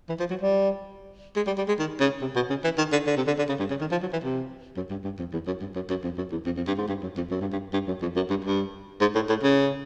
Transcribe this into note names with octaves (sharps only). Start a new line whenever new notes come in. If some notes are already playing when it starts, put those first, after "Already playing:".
E3
F3
F#3
G3
G#3
G3
G3
G#3
D#3
C#3
C3
B2
C#3
E3
D#3
D3
D3
C3
D3
D3
C#3
G2
C#3
D#3
F3
F#3
E3
C3
F#2
G2
G2
F2
E2
F#2
G2
F#2
F#2
F2
F#2
E2
F2
F2
G2
G#2
G2
F#2
F2
F#2
G2
G2
G2
F#2
F2
F#2
G2
G2
G#2
A2
A2
C#3